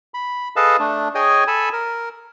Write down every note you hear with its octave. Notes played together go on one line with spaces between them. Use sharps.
B5
G#4 A4 B4 D#5 F5 A5
A3 D4
G#4 C#5 D#5 G5 G#5
A4 G#5 A5 B5
A#4